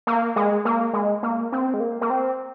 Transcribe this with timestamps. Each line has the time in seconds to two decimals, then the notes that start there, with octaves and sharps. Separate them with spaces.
0.07 A#3
0.36 G#3
0.65 A#3
0.93 G#3
1.23 A#3
1.52 C4
1.74 G#3
1.80 A#3
2.01 A#3
2.10 C4